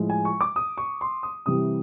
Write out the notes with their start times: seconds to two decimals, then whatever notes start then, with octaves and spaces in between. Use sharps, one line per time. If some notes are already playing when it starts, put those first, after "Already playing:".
Already playing: A2 F3 G#3
0.10 G#5
0.25 C#6
0.41 D6
0.56 D#6
0.78 C#6
1.01 C6
1.23 D#6
1.46 C3 E3 G3 D#6